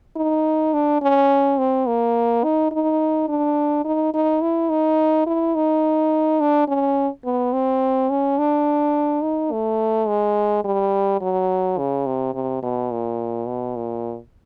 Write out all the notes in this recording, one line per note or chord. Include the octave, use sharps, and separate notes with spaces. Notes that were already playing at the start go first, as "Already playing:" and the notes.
D#4
D4
C#4
C4
A#3
D#4
D#4
D4
D#4
D#4
E4
D#4
E4
D#4
D4
C#4
B3
C4
C#4
D4
D#4
A3
G#3
G3
F#3
C#3
C3
C3
B2
A#2
B2
A#2